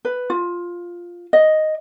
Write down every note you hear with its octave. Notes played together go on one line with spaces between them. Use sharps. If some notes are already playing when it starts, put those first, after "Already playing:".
B4
F4
D#5